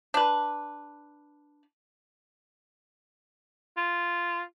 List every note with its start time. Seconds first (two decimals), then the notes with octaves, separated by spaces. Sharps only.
0.14 D4 B4
3.77 F4